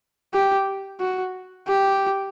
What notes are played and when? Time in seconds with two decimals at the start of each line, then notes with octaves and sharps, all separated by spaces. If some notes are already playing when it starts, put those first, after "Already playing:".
0.34 G4
1.01 F#4
1.68 G4